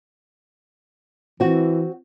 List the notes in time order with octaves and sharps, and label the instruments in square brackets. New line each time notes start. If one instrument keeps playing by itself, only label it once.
[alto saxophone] E3 [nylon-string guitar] C4 F#4